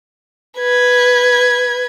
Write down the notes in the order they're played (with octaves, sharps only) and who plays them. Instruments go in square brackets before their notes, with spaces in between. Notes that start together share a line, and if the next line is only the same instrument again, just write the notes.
[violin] B4 G#6